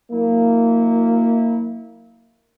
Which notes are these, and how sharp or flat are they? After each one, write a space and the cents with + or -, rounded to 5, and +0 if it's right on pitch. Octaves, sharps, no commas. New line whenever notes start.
F#3 -40 A#3 -15 E4 -30